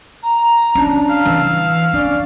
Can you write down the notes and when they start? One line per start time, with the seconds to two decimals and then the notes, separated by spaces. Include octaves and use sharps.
0.22 A#5
0.75 C#4 D4
1.10 F5
1.25 E3 E6
1.93 C#4 D4 D5